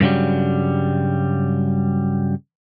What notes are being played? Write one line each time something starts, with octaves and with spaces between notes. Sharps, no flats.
G2 C#3 F#3 G3